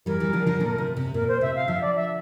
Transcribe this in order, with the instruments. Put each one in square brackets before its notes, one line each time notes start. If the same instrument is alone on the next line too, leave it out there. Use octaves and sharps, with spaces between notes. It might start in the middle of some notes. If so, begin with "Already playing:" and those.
[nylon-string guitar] E3 G3 [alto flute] A#4
[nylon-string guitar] E3 G3
D3 F3
D3 F3
A#2 D3
C3
C3
[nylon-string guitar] A#2 [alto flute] A#4
[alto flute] C5
[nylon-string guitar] C3 [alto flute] E5
[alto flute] F5
[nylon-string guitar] D3 F3 [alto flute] E5
[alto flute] D5
E5